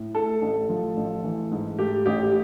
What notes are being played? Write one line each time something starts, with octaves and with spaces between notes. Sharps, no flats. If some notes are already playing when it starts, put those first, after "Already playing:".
Already playing: A2
A3 A4
A1
F3
A1
E3
G#2
A3 G4
A1 G4